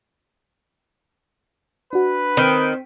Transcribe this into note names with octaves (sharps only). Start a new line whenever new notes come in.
D4 F#4 B4
D#3 C4 G5 B6